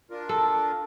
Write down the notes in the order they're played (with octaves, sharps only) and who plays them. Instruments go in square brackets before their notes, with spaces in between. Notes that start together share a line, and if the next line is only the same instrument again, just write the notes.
[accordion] D4 F4 A#4
[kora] A4